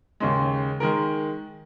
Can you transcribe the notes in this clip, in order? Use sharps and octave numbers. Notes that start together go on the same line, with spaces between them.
D#2 C#3 G#3
D#3 G#3 A#4